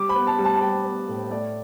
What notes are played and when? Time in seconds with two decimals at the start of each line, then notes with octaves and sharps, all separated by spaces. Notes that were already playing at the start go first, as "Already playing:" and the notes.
Already playing: G3 D6
0.09 B5
0.15 B3
0.27 A5
0.38 G3
0.44 A5
0.56 A5
0.61 G3 G5
0.84 B3
1.08 A2
1.30 A3 D5